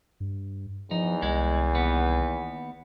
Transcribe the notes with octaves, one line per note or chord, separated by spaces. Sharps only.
G2
E2 F3 D#4
C2 G#3
D#2 B3